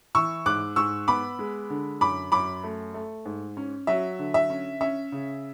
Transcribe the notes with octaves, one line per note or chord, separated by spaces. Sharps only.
E3 C#6 E6
G#2 D6 F#6
G#2 C#6 E6
B3 B5 D6
G#3
D3
F#2 B5 D6
F#2 B5 D6
A3
A3
G#2
C#4
F#3 E5
D3
E5
C#4
C#4 E5
C#3